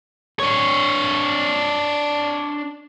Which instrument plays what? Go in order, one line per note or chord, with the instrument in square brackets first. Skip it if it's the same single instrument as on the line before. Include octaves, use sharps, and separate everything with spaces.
[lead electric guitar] D4 C#5